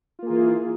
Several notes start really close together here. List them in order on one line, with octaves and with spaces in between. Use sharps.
F4 A#3 G#4 E3